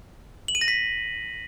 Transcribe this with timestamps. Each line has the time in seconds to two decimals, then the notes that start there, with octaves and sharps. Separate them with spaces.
0.48 F#7
0.55 D#7
0.61 A#6
0.68 B6